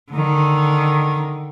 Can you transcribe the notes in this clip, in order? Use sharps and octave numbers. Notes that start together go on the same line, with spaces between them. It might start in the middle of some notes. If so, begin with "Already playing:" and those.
D3 D#3